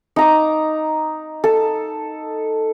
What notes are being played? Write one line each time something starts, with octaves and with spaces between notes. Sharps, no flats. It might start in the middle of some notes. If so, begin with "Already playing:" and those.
D#4 A#5 D6
A4